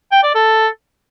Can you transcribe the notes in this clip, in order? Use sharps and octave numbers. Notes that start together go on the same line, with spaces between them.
G5
D5
A4